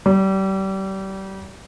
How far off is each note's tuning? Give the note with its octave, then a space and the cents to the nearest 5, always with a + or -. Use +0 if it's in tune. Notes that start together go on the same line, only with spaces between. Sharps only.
G3 -30